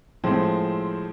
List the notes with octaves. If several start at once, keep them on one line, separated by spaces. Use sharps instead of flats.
A2 F3 G#3 C4